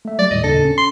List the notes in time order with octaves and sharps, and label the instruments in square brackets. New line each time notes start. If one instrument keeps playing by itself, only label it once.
[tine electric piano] A3 E5
[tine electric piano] F#3 G3 [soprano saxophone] D5
[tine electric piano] D#2 A2 D#3 [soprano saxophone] D#5
[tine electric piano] D#2 C#3 D4 [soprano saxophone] A4
[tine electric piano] C#4
[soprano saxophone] C6